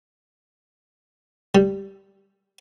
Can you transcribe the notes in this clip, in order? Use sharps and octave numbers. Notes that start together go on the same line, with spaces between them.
G3